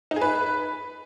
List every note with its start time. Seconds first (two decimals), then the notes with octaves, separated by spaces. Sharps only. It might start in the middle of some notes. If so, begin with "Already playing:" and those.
0.11 D#4
0.16 G#4
0.21 B4